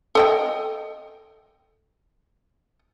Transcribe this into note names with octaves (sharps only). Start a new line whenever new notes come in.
A4 D#5 G5